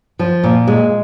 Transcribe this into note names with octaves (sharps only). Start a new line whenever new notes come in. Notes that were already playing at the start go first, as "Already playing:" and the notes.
F3
A#2
G#3